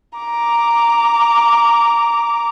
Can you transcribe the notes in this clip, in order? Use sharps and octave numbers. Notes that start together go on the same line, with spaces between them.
A#5 D6